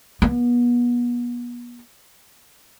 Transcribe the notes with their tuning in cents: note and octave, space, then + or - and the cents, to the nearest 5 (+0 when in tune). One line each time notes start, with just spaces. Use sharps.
B3 -35